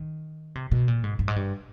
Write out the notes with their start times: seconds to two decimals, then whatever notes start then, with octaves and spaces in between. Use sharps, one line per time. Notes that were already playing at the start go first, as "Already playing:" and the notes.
Already playing: D#3
0.55 C3
0.71 B2
0.88 A#2
1.04 G#2
1.19 G2
1.28 G#2
1.36 G2